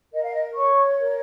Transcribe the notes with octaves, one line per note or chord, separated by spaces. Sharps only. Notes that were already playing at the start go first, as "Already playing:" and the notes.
A#4 D#5
F5
D#5
C#5 C#6
A#4